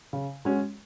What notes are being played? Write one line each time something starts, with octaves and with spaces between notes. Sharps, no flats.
C#3
G#3 C#4 F#4